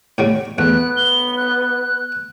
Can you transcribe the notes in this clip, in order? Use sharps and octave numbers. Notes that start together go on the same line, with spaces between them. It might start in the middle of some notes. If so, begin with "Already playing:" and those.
A2 F#3 G3
E2 A3 B3 F#6
G7
F#6